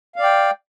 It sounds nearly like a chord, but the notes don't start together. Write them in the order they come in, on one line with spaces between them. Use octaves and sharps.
F5 D5 G5